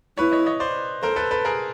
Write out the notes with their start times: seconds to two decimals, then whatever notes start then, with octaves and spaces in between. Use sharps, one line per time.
0.17 E4 B4 C#5
0.32 C#5 D#5
0.46 C#5 D#5
0.60 C5 D5
1.03 A4 A#4 C5
1.16 A4 B4
1.31 A4 B4
1.45 G#4 A#4